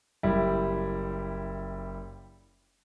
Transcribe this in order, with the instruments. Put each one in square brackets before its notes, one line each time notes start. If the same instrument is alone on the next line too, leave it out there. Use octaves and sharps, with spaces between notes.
[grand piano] F#1 G3 E4